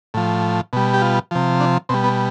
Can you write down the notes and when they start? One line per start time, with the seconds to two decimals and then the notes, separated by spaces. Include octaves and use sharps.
0.14 A2 F3
0.73 B2 G3
0.94 G4
1.02 F4
1.31 C3 F3
1.60 D4
1.89 B2 G3 C4
2.04 B3